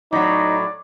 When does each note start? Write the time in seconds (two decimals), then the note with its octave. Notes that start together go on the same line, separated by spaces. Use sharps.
0.13 A2 F#3 D#4 D5